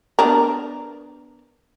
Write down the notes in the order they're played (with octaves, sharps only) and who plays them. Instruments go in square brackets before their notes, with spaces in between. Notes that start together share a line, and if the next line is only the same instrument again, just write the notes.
[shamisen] B3 D4 A#4